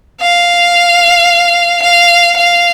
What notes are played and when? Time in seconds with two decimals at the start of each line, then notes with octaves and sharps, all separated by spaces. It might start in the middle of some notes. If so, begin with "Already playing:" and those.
0.21 F5
1.83 F5
2.37 F5